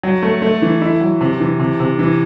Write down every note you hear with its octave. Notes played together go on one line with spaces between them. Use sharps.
F#3
A3
A3
E3
E4
F#3
C3
E3
C3
C3
E3